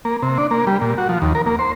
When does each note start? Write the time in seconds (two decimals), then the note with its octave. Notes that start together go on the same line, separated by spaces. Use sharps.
0.05 A#3
0.22 C3
0.38 D4
0.51 A#3
0.67 G3
0.81 A#2
0.98 F#4
1.09 F3
1.22 D#2
1.35 A#4
1.46 A#3
1.59 C5